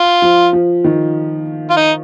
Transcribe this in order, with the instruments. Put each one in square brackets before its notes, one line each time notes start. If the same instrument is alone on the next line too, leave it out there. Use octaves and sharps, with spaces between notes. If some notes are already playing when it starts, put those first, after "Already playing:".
Already playing: [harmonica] F4
[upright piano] F3
F3
D#3
[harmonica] F4
D#4